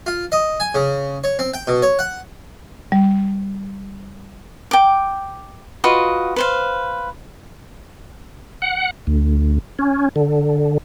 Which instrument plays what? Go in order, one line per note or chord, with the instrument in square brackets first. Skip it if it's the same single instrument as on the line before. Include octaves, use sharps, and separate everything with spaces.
[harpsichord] F4
D#5
G#5
C#3
C#5
C4
G5
B2
C#5
F#5
[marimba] G3
[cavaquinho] G5 D6
F4 F#4 B4 D#5
B4 C5 F5
[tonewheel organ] F#5
D2
C#4
D3